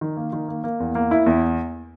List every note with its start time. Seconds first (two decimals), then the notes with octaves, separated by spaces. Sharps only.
0.01 D#3
0.17 A#3
0.33 D#3
0.48 A#3
0.64 A#3
0.80 E2
0.95 A#3
1.11 E4
1.26 E2